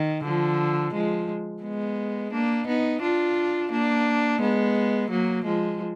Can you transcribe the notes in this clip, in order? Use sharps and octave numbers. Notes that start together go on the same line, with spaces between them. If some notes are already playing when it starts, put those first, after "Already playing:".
Already playing: D#3
D3 F3
F3 G#3
G#3 B3
A#3 D4
B3 D#4
D4 F4
A#3 D4
G#3 B3
F#3 A#3
F3 G#3